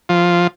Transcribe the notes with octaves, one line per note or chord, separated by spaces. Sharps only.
F3